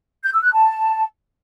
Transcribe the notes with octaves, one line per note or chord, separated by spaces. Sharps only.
G6
E6
F#6
A5